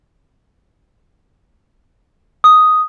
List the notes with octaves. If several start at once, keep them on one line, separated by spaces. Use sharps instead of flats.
D#6